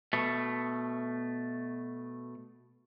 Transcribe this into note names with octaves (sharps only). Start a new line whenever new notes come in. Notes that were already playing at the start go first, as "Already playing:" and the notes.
B2 A3